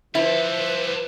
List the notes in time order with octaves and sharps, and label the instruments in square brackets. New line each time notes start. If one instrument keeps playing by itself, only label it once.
[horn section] F3 C5 [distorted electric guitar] G3 A4 [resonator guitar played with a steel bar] E4 [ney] B4